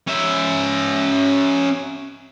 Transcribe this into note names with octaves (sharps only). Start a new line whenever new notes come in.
C#4 E5